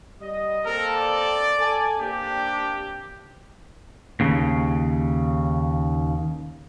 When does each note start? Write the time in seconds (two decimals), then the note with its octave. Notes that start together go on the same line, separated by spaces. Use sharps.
0.21 G3 D#5
0.65 A#3 C4 A4 A#4
0.96 D5
1.59 A4 G#5
2.00 A#3 C4 D4 G4
4.20 D#2 C#3